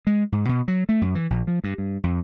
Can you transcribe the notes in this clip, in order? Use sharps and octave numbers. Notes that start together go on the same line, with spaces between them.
G#3
G#2
B2
F#3
A3
F#2
E3
A#1
F3
G2
G2
F2